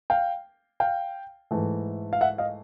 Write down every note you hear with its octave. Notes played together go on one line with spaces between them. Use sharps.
F5 G5
F5 G5
G#2 E3 A3
F5
E5 F#5
D#5 F5